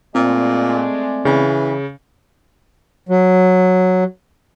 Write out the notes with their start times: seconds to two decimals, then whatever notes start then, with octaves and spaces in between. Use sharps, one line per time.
0.15 A#2 G#3 A3 C4 D5
1.25 C#3 E3
3.09 F#3